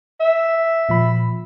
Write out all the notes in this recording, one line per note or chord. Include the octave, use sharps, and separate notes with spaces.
E5
A#2 F3 B5